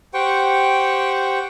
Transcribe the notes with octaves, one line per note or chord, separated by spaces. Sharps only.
G4 C5 F#5 G5 C#6